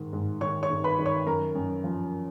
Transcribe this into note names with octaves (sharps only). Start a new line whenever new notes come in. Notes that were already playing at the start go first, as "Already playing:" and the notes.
Already playing: G#2 D#3
G#2
D#3 C#5 C#6
C#5 C#6
D#3
B4 B5
D#3
C#5 C#6
F#2 A#4 A#5
F#2
F3